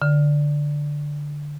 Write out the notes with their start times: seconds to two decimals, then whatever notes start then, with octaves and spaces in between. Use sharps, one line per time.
0.02 D3